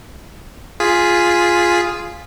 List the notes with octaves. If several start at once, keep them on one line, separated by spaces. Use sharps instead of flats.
F4 G#4 B6